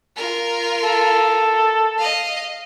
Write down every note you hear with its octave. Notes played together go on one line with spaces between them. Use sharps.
F4 A#4
A4
D#5 F5